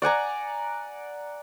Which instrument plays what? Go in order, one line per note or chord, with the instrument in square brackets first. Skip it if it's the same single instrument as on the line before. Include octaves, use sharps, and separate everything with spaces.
[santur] D5 F#5 G#5 A#5